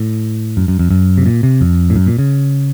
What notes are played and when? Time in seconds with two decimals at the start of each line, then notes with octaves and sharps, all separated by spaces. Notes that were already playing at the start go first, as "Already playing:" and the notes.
Already playing: A2
0.57 F#2
0.68 F#2
0.79 F2
0.91 F#2
1.18 C3
1.26 A#2
1.43 C3
1.61 F2
1.90 A2
1.96 F#2
2.07 A#2
2.19 C#3